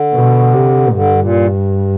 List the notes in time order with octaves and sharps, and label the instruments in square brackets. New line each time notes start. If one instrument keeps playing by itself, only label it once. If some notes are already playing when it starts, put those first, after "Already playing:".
Already playing: [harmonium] D3
[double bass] B2
C3
[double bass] G2 [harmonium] D3
[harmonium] A#2